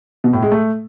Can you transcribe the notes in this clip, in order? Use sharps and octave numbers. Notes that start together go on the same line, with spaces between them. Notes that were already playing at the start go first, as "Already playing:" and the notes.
B2
A2
G#3
A3